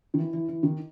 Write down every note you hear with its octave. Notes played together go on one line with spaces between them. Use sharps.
D#3
E3
E3
E3
D#3